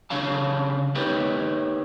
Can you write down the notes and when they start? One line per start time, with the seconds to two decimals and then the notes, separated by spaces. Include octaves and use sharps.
0.10 C#3 D4 C#5 F5 A5
0.95 D#4 G4 B4 C#5